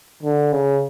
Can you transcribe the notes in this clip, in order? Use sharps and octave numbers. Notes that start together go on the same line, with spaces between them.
D3
C#3